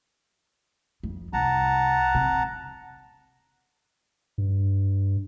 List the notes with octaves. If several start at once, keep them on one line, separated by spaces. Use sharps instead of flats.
F2
C2 F#5 A5 A#5
C3
G2